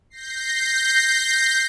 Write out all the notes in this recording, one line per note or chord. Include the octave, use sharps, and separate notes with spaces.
G6 A#6 C7